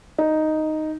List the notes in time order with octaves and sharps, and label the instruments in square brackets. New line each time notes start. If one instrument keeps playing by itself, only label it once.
[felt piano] D#4